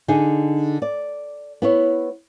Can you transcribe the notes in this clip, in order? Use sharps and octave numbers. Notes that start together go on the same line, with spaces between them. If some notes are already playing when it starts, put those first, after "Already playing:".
D3 D#4 G#4
D5
B3 E4 C#5